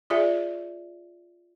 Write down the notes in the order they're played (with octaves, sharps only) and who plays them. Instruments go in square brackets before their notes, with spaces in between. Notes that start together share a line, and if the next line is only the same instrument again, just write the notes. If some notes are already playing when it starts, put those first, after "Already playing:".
[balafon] F4 G#4 D5 E5